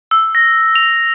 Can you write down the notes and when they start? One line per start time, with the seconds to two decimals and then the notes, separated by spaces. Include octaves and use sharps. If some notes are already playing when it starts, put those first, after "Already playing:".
0.11 E6
0.35 A#6
0.75 F7